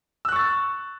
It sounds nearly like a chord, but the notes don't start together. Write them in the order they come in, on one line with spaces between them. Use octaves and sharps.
E6 F#6 C#6 A6